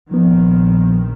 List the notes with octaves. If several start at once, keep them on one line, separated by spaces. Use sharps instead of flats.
A#1 A#2 D#3 F3 B3